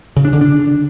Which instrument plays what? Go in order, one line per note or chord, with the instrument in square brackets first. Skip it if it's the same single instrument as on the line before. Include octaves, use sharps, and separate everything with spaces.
[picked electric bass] C#3
D4
D3
D4